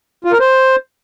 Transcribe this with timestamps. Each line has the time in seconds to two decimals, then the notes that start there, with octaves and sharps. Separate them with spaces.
0.24 F4
0.32 A#4
0.40 C5